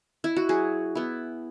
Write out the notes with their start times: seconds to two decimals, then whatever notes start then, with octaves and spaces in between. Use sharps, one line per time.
0.24 E4
0.36 F#4
0.49 F#3 G#4
0.95 B3 E4